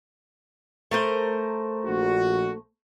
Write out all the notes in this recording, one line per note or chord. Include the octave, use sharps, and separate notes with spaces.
A3 A#4 C5
A#1 F#4